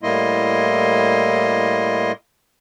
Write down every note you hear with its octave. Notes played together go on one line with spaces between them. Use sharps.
A2 G3 A#3 E4 D#5 C6